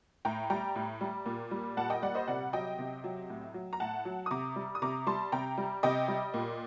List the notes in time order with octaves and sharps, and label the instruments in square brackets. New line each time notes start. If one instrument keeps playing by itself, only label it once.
[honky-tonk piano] A2 G5 A#5
G3 G5 A#5
A2
G3
A#2
G3
A#2 F#5 A5
D#5 G5
G3 D5 F#5
C5 D#5
C3 D5 F#5
F#3 D#5 G5
C3
F#3
A2
F#3
A#5
A2 F#5 A5
F#3
D#6
C3 A#5 D6
G3
D#6
C3 A#5 D6
G3 A5 C6
C3 G5 A#5
G3
C3 D#5 G5
G3
A#2